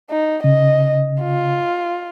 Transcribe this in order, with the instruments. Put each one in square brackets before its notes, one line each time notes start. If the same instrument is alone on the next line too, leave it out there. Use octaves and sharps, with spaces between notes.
[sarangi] D#4
[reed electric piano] C#3 [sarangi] D#5
[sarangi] F4